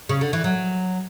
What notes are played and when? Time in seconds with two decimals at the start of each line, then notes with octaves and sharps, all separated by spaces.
0.09 C#3
0.21 D3
0.33 E3
0.44 F#3